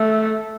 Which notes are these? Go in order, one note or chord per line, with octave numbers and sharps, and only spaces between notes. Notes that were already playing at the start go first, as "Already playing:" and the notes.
Already playing: A3